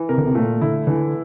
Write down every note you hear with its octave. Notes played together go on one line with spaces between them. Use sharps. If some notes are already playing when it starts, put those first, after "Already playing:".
Already playing: E3
C3 A#4
D3
C3
A#2 A3
D3 E4
D3 E3